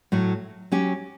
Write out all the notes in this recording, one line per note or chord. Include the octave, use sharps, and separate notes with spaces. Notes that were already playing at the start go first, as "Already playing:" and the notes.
A2 F#3 A3
F#3 C#4 G4